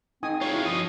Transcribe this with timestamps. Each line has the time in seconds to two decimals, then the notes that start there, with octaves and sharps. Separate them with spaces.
0.23 C4 D#4 G#5 D#6
0.41 F4 G#4 C#5
0.53 E4 F#4
0.66 F3 D#5 D#6